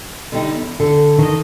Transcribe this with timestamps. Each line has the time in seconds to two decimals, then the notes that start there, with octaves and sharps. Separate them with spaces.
0.32 D3 G3 D#4
0.54 E2
0.80 D3 A4
1.19 D#3 D#5